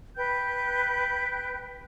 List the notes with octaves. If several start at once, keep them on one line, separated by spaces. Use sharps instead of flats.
B4 G5 F#6 G6